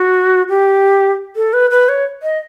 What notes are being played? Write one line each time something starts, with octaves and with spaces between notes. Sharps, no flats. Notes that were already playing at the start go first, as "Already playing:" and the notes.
Already playing: F#4
G4
A4
B4
B4
C#5
D#5